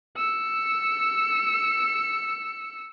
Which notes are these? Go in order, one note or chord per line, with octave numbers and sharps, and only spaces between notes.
E6 C#7